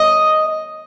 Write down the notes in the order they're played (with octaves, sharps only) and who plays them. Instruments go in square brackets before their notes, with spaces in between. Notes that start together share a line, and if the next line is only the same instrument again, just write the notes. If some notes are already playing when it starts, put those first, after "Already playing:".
Already playing: [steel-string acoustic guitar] D#5